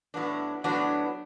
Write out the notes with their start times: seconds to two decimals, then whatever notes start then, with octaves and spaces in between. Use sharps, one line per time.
0.14 A2 F#3 B3 D4
0.64 A2 F#3 B3 D4